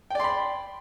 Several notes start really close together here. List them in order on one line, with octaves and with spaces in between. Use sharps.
G5 D5 C6 B5